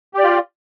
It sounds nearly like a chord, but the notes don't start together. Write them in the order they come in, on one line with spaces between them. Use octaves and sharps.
G4 D5 F4